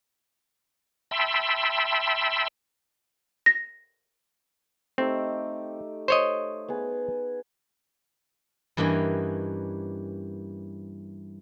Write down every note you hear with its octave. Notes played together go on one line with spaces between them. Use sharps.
E5 G5 A5 B5 C6 E6
A#6
A3 C4 D#4 G4
C5 C#5 D#5
B3 G#4
G2 E3 A#3 C#4 D#5